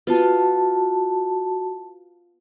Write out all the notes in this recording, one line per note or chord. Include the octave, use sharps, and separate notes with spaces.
B3 F4 F#4 A5